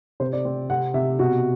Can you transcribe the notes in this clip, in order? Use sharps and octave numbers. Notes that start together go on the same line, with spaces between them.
C3 C5
D5
C4
C3 F#5
C3 E5
B2 F#4